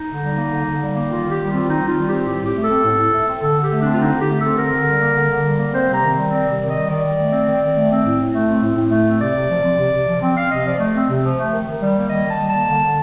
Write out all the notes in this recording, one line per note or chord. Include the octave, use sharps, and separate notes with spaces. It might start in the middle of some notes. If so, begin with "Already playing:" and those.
Already playing: D#4
D3
G3
A#3
D3
D3
G3
A#3
D#3 F4
D#3 G4
G3
C4 F4
D#3 D#4
D#3
F4
G3
C4 G4
A2 G4
A2 G4
A3
C4 A4
A2
A2
A3
C4
D3 A4
D3
G4
A3
C4 D4
F4
D3 D#4
D3
G4
A3
A4
C4
D3 A#4
D3
G3
A#3
D3
D3
G3
A#3
C4 C5
C3 A#5
D#3
G3
C4 D5
C3
D5
D#3
D#5
G3
D#3 D5
D#3
A3
C4
D#3
D#3
A3
C4
A2
A2
A3
C4
A2
A2
A3
C4
C3 D5
C3
F3
C4
C3
C3
F3
C4
C4 F5
C3 D#5
F3 D5
A3
C4
C3
F3
A3
D#3
D#3
G3
A#3
D#3 D#5
D#3 A5
G3
A#3 A5
D3
D3